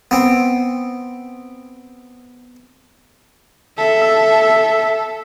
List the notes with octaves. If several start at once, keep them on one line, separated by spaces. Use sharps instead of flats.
B3 C4
A4 E5